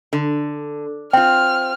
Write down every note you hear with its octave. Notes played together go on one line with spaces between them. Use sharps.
D3
C4 F4 G5 F6